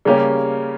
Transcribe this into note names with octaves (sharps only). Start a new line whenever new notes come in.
C#3 G3 A#3 C#4 G4